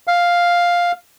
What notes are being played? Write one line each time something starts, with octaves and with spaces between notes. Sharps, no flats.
F5